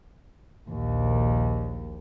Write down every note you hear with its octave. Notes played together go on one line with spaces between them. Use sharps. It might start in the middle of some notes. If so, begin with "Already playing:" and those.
A#1 D#2